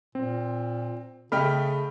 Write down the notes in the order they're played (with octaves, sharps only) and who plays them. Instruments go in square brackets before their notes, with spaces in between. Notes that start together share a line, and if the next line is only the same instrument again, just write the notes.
[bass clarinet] A#2 [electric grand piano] C4
[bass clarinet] C#3 [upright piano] A3 D#5 G5 [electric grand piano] B5 F6